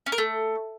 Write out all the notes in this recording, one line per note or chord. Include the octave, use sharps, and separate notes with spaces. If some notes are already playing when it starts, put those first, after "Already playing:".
C#4
A#4
A3